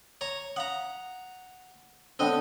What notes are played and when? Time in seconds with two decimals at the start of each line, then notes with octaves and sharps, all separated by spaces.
0.21 C#5 A#5
0.56 F5 F#5 A#5 D#6
2.19 D3 B3 C4 D4 C5 C#5 D#5 G5